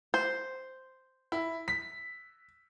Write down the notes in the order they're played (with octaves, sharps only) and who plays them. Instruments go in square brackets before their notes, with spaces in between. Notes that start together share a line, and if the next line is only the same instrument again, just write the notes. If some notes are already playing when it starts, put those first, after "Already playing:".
[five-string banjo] C5
[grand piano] E4
B6